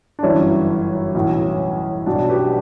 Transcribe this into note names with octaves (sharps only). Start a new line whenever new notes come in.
D4
G1 F#2 E3 C#4 E4
B1 A2 E3
B1 B2 D4
G4 B4